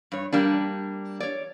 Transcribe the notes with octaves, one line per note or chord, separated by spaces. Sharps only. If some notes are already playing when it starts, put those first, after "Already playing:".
G2 C#5
G3 A#3 D4
C#5 D5